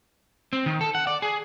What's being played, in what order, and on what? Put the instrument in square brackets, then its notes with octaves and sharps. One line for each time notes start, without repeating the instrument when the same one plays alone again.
[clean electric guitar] C4
D#3
A4
F#5
D5
G#4